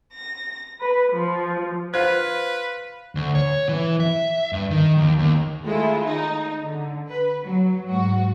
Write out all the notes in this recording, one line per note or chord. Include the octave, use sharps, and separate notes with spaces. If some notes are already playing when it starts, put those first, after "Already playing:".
A#6
B4
F3
F4 B4 C5 F#6
D2
C#5
E3
E5
G2
D#3
D#2
D#2
D#3 G#3 A3 E4 F4
D#4
D3
B4
F#3
G#2 F#4